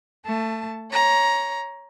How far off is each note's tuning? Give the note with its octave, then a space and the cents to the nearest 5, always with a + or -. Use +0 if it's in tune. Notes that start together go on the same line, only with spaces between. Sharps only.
A3 +25 A5 +0
C#5 +0 A#5 +15